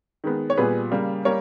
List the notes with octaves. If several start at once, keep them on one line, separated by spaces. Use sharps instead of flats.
D#3 G#3 B3
C#5
A#2 G3 B3 G#4 B4
C#3 G3 A#3
G3 A#3 A#4 C#5